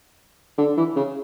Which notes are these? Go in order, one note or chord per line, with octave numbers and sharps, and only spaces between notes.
D3
E3
C#3